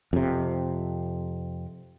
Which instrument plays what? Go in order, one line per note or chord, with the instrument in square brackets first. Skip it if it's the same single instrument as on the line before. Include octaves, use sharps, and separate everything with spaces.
[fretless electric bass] F2 C3